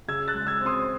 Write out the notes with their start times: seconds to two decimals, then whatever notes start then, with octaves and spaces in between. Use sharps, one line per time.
0.08 C#3 E6 G#6
0.28 F#6 A6
0.34 G#3
0.47 E6 G#6
0.61 C4
0.66 C6 D#6